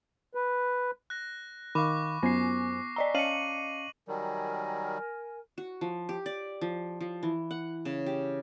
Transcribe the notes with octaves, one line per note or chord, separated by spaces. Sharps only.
B4
F#6 A#6
D#3 F5 B5 C#6 D6
F#2 B3 C5 G#5 A#6 C7
D5 D#5 A#5
C#4 D#5 F5 A5 C#7 D#7 F#7
D#3 F#3 G3 A#4 G#5
F#4
F3
G4
D5
F3
F3
E3
F#5
C#3
G4